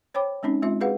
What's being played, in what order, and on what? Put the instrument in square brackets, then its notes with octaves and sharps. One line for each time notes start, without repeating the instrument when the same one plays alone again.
[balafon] C5 C#5 G5 B5 D6
G#3 C4 C#4 D#4
G#3 C4 F4 E5
F#4 G#4 B4 F5 F#5